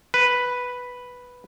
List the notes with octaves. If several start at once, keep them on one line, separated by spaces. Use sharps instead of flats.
B4